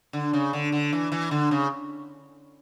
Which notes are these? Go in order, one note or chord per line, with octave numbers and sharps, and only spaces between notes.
D3
C#3
D3
D3
E3
E3
D3
C#3